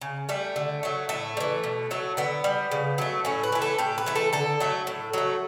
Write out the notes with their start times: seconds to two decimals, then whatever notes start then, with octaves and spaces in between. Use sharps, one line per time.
0.01 C#3
0.29 G3 A3
0.56 D3
0.83 F#3 A3
1.09 A2 A3
1.37 G3
1.40 E3
1.64 B2
1.91 F#3 A3
2.17 D3 B3
2.44 G3
2.71 C#3
2.98 F#3 A3
3.25 A2 C#4
3.44 B4
3.52 E3 A3
3.62 A4
3.78 A2 G4
3.98 B4
4.06 E3 A3
4.16 A4
4.33 D3 A4
4.60 F#3 A3
4.87 A2
5.13 F#3 A3